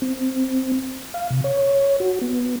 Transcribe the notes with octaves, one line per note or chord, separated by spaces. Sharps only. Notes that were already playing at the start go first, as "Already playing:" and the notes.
C4
F5
C3
C#5
F#4
B3